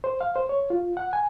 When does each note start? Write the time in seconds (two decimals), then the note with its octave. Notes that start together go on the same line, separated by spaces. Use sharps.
0.04 C5
0.21 F5
0.36 C5
0.49 C#5
0.70 F4
0.97 F#5
1.13 G#5